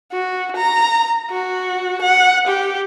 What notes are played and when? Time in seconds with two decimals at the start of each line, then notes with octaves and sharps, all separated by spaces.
0.12 F#4
0.56 A#5
1.30 F#4
2.02 F#5
2.47 G4